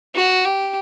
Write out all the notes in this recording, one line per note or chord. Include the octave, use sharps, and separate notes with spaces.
F#4
G4